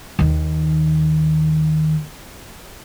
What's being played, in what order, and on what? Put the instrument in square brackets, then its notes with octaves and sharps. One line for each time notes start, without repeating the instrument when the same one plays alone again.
[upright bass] D#2 D#3